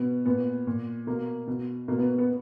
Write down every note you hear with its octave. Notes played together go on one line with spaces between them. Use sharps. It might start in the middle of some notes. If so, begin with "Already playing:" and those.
Already playing: B2 B3
A#2 B3
A#2
B2 A#3
B2
B2 A#3
B3
B3